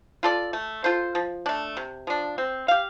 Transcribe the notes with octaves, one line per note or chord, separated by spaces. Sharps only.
F4 A4 D5
A3
F4 A4 C5
F3
A3 D4
C3
F3 D4
C4
G4 F5